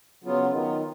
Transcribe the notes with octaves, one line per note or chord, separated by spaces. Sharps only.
C#3 F#3 B3 F4
D#3 F#3 B3 F4